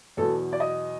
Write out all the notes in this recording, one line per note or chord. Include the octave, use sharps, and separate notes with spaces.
E2 B2 F#3 A4
D5
D#5